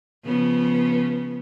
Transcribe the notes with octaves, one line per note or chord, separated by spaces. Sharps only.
C#3 F3 B3